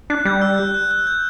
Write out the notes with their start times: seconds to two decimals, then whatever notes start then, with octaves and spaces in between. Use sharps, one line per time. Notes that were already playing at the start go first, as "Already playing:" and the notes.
0.10 D4 F#6
0.25 G3 G6
0.41 E6
0.58 F#6
0.74 F#6
0.91 F#6
1.07 G6